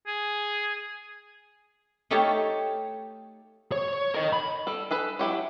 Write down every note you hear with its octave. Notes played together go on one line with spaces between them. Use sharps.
G#4
A3 D#4 G4 C#5 F5 A5
C#5
A#4 D#5
B5
G3 A4
G#4 A4 B4
F#3 E4 G4 C#5